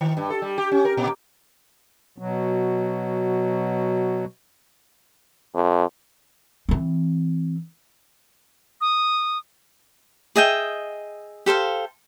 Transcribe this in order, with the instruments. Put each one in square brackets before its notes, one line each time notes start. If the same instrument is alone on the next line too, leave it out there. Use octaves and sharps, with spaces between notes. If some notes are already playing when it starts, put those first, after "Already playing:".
[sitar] D#3
G2
A4
G3
G4
C#4
A#4
A#2
[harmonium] B2 F#3
[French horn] F2
[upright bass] E3 C4
[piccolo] D#6
[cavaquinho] G#4 D#5 E5 G5
G4 A4 C5 F5